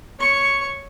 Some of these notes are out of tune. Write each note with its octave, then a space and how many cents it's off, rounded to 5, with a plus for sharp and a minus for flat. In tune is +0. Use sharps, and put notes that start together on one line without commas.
C#5 +0 C#6 +0